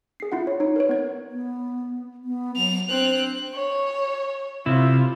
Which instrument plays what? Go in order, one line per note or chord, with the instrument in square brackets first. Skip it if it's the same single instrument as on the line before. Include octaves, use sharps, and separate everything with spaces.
[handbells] G#4 C7
E4 F4 F#5
C#5
D#4 C#5
A#4 B4 C#5
B3 G#6
[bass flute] B3
B3
[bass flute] F#3 [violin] F7
[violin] C4 F#6 [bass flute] D4
[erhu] C#5
[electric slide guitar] C3 E4 [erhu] F4